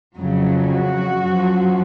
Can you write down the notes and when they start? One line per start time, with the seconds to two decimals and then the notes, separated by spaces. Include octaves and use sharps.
0.16 F2 C#3 F#3
0.70 F#4
1.24 F#2 F3